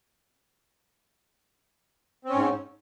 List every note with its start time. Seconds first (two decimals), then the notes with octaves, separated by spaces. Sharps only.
2.25 C4
2.30 C#4
2.35 G#2